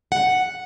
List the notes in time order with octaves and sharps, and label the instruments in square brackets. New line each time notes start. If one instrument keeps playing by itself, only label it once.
[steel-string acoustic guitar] F#5